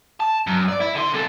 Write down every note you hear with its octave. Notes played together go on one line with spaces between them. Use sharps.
A5
F#2
D5
E4
D3 C6
C3 A4